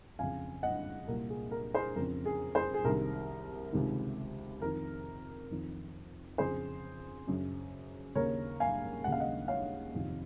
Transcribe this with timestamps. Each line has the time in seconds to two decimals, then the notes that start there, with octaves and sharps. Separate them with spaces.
0.19 F2 C#3 F5 G#5
0.63 D#5 F#5
1.08 C2 A#2 A#4
1.30 G#4
1.51 A#4
1.74 G#4 C5
1.95 F2 C#3 A#4
2.25 G#4
2.55 G#4 C5
2.74 G#4
2.84 C2 C3 D#3 A#4
3.73 C#2 C3 D#3
4.61 F2 D#3 A#4
5.51 F2 D#3
6.38 F2 C#3 G#4 C5
7.27 F#2 C#3
8.15 D#2 C#3 A#4 C#5
8.60 F5 G#5
9.04 D#2 C#3 F#5
9.12 F5
9.20 D#5 F#5
9.48 C#5 F5
9.94 F2 C3 D#3